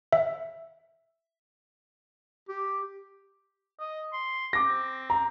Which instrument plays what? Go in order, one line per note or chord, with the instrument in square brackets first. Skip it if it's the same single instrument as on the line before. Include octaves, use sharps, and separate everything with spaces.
[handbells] E5
[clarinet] G4
[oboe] D#5
C6
[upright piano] D6 A#6
[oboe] C4
[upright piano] A#5